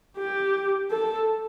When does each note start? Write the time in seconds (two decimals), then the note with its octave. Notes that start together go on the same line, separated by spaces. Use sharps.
0.17 G4
0.91 A4